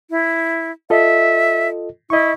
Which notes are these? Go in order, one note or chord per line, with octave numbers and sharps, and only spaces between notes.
E4
F4 A4 D#5 E5
E4 D#5 C#6